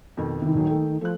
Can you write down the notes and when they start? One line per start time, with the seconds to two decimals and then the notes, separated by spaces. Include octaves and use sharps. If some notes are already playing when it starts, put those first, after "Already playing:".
0.17 F2 B2 D#3
0.42 C3 D#3 E3
0.54 D#1 F#3
0.67 A3 G5
1.01 F3 A3 F#6